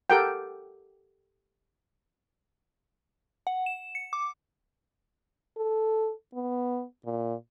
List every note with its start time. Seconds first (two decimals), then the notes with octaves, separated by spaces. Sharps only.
0.10 G4 A4 A#4 F#5 G5
3.47 F#5
3.66 E7
3.95 C#7
4.13 D6
5.57 A4
6.34 B3
7.05 A#2